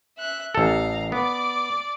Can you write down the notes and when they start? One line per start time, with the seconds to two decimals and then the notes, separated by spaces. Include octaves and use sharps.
0.18 E5 F#6
0.55 A1 A4 F5 A#5
1.12 B3 D5 D6